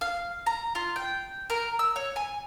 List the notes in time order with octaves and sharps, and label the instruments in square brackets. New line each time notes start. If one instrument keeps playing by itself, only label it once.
[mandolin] F5
A#5
F4
G5
A#4
E6
C#5
G#5